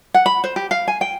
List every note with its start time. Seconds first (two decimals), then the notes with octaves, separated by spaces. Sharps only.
0.14 F#5
0.26 B5
0.44 C5
0.56 G4
0.71 F5
0.88 G#5
1.01 G5